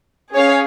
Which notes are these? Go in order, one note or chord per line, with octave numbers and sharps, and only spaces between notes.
C#4 G#4 C#5 F5